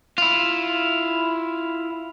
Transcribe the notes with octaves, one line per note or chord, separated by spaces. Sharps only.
E4 F4